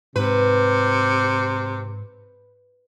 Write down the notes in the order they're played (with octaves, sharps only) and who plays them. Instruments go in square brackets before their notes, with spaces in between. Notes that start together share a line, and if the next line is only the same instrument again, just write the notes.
[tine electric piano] G#2 [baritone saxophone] C3 [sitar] B4